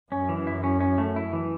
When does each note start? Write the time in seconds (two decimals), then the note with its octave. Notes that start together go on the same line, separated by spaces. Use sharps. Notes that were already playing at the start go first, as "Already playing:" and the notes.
0.11 F#2 C#4
0.29 E3
0.47 E4
0.64 C#4
0.80 C#4
0.98 A3
1.16 E4
1.33 E3